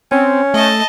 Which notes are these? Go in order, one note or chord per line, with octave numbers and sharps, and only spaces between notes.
C4 C#4
A3 D#5 A5